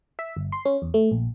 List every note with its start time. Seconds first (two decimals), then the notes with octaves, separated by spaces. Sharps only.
0.19 E5
0.37 G1
0.52 C6
0.65 C#4
0.82 E2
0.94 A3
1.11 A#1